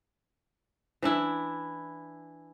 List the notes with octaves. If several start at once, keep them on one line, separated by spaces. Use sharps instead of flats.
E3 D4 E4